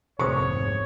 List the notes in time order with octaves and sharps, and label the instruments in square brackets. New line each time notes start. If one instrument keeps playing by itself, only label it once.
[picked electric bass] F1 G#2 C3 [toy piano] G#4 C5 D#6 [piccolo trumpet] C#5 [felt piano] C#6